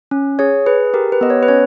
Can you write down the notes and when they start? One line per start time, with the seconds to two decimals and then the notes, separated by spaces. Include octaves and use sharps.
0.11 C#4
0.39 G#4 C#5
0.66 G#4 B4
0.94 G4 A#4
1.12 B4
1.21 B3 D#5
1.30 C#5
1.43 B4
1.48 C#4 C#5